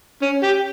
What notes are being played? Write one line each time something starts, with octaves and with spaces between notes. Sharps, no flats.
C#4
G4